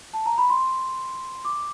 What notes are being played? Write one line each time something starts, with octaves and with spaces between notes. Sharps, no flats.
A5
A#5
B5
C6
D6